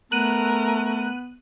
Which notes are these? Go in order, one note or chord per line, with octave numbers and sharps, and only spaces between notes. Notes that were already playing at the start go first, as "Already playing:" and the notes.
A3 B3 A#4 F#6 D#7